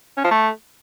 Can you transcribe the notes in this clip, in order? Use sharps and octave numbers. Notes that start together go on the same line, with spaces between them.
C#4
F3
A3